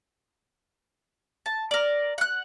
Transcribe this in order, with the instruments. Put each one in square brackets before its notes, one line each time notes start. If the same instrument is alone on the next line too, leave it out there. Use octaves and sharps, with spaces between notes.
[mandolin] A5
A#4 D5
F#5 F#6